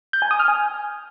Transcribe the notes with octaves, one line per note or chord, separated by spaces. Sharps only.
G6
G#5
D#6
F6
G#5